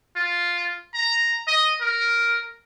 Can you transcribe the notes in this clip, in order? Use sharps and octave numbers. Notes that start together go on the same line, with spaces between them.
F4
A#5
D#5
A#4